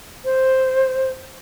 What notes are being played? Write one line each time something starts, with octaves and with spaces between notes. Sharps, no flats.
C5